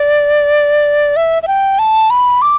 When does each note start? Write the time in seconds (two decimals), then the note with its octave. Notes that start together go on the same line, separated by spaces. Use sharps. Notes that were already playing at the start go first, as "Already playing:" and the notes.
Already playing: D5
1.16 E5
1.43 E5
1.48 G5
1.79 A5
2.10 B5
2.42 D6